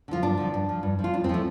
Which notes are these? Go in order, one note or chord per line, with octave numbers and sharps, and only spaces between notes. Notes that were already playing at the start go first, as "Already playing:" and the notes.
D3 F3 F4
G2 D4
D3 F3
G2
F3
G2
F3
F4
F2 D4
C4
F3 A3